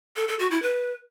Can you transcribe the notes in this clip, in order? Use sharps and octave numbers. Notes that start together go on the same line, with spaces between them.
A4
A4
F#4
E4
B4